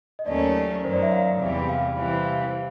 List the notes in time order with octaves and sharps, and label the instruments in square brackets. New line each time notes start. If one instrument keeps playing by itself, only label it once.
[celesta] D#5
[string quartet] D#2 D#3 F#3 A3 C#4 [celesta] D5
[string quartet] F#2 D#3 F#3 [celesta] C5
[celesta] D5
E5
F5
[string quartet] E2 C3 E3 G3
[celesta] F5
[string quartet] C3 E3 G3 C4
[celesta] F5